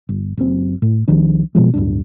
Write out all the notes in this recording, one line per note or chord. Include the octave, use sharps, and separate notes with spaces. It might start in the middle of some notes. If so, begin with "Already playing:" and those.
G1
F#1 F#2 C4
A2
C2 D#3 F3 D4
B2 D3 F3 G#3
D1 G1 G2 D4